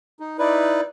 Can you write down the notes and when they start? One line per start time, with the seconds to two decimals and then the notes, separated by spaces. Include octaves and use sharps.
0.20 D#4
0.39 D#4 E4 B4 D5